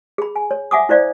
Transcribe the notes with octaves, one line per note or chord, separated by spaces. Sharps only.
G#4 B5
G#5
C#5
E5 F#5 G#5 D6 D#6
E4 C5 D5 F5